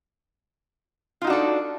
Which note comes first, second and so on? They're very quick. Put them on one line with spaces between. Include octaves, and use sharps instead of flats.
F4 D#4 F#4 D4 A4